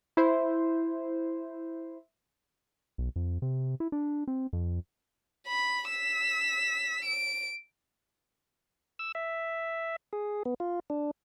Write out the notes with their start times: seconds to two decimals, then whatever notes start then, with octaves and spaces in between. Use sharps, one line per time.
0.17 E4 C5
2.98 B1
3.16 F2
3.42 C3
3.80 E4
3.92 D4
4.28 C4
4.53 F2
5.48 B5
5.89 E6 B6
7.05 D7
8.99 E6
9.15 E5
10.13 G#4
10.45 B3
10.60 F4
10.90 D4